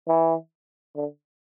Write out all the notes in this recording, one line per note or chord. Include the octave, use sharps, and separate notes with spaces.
E3
D3